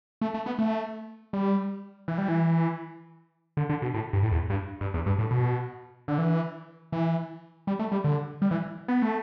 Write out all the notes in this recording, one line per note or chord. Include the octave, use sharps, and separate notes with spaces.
A3
A3
B3
A3
G3
E3
G3
E3
D3
D3
B2
A2
G2
A2
E2
G2
G2
E2
G2
A2
B2
D3
E3
E3
G3
A3
G3
D3
G3
E3
B3
A3